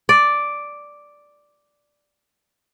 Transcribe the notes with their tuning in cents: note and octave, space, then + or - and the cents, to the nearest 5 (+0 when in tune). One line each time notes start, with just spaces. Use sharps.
D5 +0